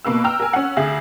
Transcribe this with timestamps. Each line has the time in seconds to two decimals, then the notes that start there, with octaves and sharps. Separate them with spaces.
0.05 B2 A#3 B4 E6
0.24 G5 A#5 E6 F6
0.40 A#4 G#5
0.53 C#4 F#5
0.77 D2 G#4 E5 F#7